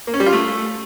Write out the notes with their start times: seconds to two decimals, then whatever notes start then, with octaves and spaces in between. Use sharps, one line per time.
0.07 A#3
0.14 C#4
0.20 G3
0.26 F4
0.33 A3